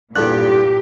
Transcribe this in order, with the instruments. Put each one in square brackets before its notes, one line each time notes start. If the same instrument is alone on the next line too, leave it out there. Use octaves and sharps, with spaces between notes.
[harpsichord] E2 G2 [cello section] A#2 G4 [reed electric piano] A4 F#6